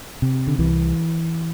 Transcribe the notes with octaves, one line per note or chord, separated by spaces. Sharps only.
C3
D3
C2 E3